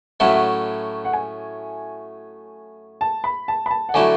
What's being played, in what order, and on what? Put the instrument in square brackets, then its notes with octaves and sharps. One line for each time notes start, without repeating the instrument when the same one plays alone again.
[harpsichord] A2 F#3 A3 C#4 E4 [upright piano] F#5
[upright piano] E5
F#5
F#5
G#5
A5
B5
A5
B5
A5
F#5
[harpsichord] D3 F#3 A3 E4 [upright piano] G#5